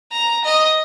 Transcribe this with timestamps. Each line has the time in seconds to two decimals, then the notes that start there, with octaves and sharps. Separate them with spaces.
0.12 A#5
0.45 D#5